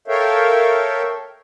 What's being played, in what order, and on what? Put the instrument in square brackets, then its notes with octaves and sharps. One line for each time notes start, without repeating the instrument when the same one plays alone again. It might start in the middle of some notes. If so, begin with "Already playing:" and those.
[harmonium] A4 A#4 C#5 E5 F5 G5